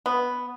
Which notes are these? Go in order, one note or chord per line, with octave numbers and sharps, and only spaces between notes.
B3